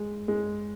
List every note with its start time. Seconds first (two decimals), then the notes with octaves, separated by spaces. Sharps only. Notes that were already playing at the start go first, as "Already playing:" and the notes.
Already playing: G#3
0.28 G#3